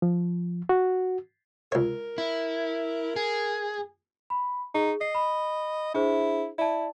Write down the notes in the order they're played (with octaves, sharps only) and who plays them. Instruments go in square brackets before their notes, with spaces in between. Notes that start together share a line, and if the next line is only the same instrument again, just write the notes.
[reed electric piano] F3
F#4
[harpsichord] C#2 C#5 [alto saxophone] A#4
[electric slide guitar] E4
G#4
[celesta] B5
[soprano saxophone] D#4 [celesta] G#4
[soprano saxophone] D#5 [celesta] C7
[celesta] B5
[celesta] D4 G#4 C5 [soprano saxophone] E4
[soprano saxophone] E4 [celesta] D5 A5